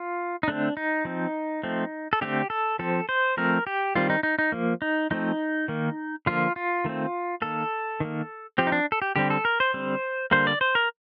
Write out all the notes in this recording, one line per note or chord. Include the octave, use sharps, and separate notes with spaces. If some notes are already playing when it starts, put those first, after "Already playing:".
Already playing: F4
D#4
D3 A3 C4 D4
D#4
F3 C4
F3 A3 C4
A4
D3 A3 C4 G4
A4
F3 C4 A4
C5
F3 A3 C4 A#4
G4
D#3 G3 C4 F4
D#4
D#4
D#4
F3 A#3
D#4
F3 A3 C4 D#4
D#3 A#3
D3 F3 A#3 F4
F4
D#3 A3 C4
D#3 A#3 A4
D#3 A#3
F3 C4 G4
D#4
D4
A4
G4
D3 G3 C4 G4
A4
A#4
C5
D3 G3 C4
D3 G3 A#3 C5
D5
C5
A#4